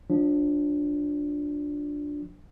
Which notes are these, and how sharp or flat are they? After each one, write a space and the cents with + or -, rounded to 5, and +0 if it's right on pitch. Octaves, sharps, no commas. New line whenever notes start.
F3 +30 D4 +0